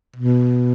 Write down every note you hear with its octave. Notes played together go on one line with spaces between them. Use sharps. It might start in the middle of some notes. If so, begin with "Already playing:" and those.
B2